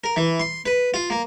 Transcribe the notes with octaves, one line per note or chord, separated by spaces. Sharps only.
A#4
E3
C6
B4
F4
A#3